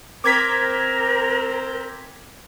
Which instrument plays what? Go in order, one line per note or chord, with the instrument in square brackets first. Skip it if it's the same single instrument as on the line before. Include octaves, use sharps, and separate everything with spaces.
[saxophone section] C4 [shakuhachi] A#4 [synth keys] D6 G#6 B6